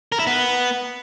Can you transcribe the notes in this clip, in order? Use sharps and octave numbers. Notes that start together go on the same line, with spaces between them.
A#4
E4
B3